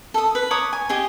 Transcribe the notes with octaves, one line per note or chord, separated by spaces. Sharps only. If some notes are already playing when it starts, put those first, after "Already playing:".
A4 D#6
B4
C#5 A#5 D6 D#6
G#5
G4 G#4 D#5